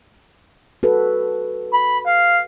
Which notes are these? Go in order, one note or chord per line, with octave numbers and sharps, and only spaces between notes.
F#4 A4 B4
B5
F5